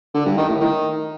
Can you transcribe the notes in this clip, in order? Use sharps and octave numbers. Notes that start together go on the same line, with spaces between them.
D3
G2
D#3
A2
D#3